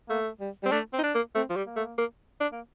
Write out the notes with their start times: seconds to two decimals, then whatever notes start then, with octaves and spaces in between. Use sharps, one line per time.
0.09 A3 A#3
0.41 G3
0.63 G3 C4
0.72 A3 D4
0.93 C4
0.99 D#4
1.03 D4
1.14 A#3
1.35 A3 C4
1.49 F3
1.56 G3
1.66 A#3
1.76 A3
1.98 A#3
2.40 D4
2.52 A#3